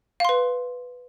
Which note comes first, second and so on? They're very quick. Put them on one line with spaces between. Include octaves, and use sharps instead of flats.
F5 C6 B4